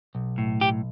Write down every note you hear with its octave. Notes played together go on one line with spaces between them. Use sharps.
B1
A2
B1 G4